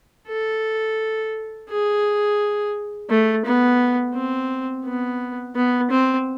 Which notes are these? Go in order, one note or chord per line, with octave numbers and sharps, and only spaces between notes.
A4
G#4
A3
B3
C4
B3
B3
C4